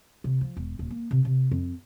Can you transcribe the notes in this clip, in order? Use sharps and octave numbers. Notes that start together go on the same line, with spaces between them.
C3
F3
E1
D#1
A#3
C3
C3
F2